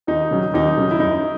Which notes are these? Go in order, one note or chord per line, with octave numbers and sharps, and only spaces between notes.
D#2 D#4
C#3 F#3
D#2 D#4
C#3 F#3
E4
F#2 D#4